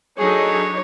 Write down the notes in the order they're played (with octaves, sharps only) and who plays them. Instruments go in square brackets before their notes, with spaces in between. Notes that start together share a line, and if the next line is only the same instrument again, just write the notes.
[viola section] F#3 D4 D#4 [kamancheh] G#4 A4 [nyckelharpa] C#5